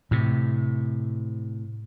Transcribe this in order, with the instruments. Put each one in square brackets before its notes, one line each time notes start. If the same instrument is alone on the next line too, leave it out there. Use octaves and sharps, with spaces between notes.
[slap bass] A2 C3